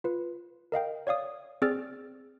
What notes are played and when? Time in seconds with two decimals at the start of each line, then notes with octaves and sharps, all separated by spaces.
0.04 F4 B4
0.72 A#4 D#5 F5 G5
1.07 C#5 D5 F5 D#6
1.62 C4 G#4 D5 E6 F6 A6